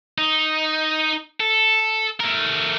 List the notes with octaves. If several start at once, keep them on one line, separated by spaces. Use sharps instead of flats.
D#4
A4
A3 A#4